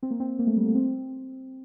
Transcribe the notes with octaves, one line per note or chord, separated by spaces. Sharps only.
C4
A#3
C4
A#3
A3
G3
A3
C4